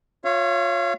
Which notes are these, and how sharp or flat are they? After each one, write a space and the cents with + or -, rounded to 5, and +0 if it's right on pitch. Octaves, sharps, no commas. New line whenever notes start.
F4 +30 C#5 +0 F5 -40